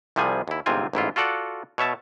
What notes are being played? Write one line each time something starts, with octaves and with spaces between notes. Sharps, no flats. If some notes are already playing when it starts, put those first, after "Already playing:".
C2 C3 F3 G3 G#4 G#5
D#2 E4
G1 G#2 C3 C4 F4 G#5
A1 G#2 E4 F4
F4 F#4 A4 D5 F#5
B2 C#5 E5 A5